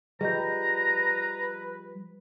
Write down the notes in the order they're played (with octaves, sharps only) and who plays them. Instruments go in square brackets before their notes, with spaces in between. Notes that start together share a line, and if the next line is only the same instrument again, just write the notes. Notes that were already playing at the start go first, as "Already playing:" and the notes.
[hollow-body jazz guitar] F3 G3 [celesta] G#4 D#5 G6 [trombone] B4 [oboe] A#5